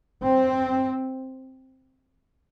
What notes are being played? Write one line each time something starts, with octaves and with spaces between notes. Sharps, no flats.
C4